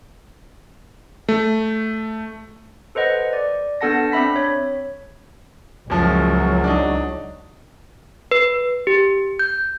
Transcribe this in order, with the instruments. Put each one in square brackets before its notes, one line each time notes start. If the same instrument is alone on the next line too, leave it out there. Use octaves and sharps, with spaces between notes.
[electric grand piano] A3
[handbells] A4 B4 C5 D#5 F#5
D5
B3 D4 A4 F#5 A5 A#6
C4 D4 E5 B5 B6
C#5
[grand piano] F#1 F3 [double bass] C#2 F#3
[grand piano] D4 D#4
[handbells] B4
G4
G6